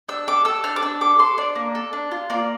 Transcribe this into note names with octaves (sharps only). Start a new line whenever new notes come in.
D4 E6
A4 D6
A4 E6
D4 F6
D6
D4 E6
A4 D6
A4 C6
D4 D5
A#3
A4
D4
F4
A#3 D5